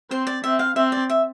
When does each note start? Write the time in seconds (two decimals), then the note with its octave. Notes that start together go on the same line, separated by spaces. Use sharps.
0.10 C4 C5
0.27 D5
0.44 C4 E5
0.59 F5
0.76 C4 E5
0.92 D5
1.10 E5